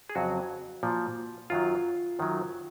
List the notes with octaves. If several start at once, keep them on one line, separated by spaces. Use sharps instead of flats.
G#4
F2 C#3 F#3 F#4
A#2 F3
F#2 D#3 F#3 F4
F#2 D#3 F#3